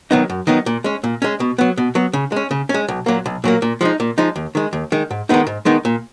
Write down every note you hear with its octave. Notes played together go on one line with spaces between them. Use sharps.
D#3 F#3 B3 D#4
F#2
D#3 F#3 B3 D#4
A#2
G#3 C#4
A#2
G#3 C#4
B2
F#3 B3
B2
F#3 B3
C#3
G#3 C#4
C#3
C#4
G#3
B1
A#2 F#3 A#3
B1
A#2 F#3 A#3
A#2
F3 G#3 D#4
A#2
F3 G#3 D#4
D#2
D#3 G#3
D#2
D#3 G#3
G#2
D#3 G#3 B3 D#4
G#2
D#3 G#3 B3 D#4
A#2